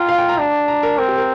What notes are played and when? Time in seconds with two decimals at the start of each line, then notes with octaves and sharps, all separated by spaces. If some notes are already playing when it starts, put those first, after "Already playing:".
Already playing: F4 G5 A#5
0.09 F5
0.18 G5
0.29 A#5
0.38 D4
0.68 A#5
0.83 A#4
0.98 C4 A#4
1.08 G4
1.18 A#4